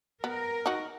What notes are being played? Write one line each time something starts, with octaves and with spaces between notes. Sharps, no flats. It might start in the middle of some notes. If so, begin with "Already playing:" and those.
B3 A#4
D#4 F#4